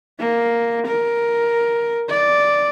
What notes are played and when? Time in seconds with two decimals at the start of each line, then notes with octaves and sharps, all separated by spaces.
0.19 A#3
0.87 A#4
2.10 D5